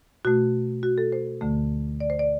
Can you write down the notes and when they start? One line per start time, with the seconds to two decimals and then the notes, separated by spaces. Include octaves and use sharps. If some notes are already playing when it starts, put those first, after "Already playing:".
0.25 B2 A3 F#4
0.83 F#4
0.98 A4
1.12 C5
1.41 D2 D3 A3
2.00 D5
2.10 C5
2.19 D5